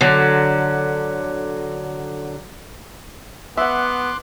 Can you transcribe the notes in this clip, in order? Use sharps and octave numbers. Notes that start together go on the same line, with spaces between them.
D3 F#3
B3 E5 F#5 C6 D6 F#6